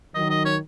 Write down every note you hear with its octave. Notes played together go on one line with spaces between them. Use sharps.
D#3 F#3 D#5
D#5
C#5